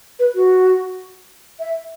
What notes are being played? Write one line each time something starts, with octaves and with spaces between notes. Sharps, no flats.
B4
F#4
E5